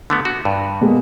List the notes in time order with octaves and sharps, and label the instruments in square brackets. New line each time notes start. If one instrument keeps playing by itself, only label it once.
[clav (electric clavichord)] D3 A3 B3
F#4
G2
[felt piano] B2 G#3 A#3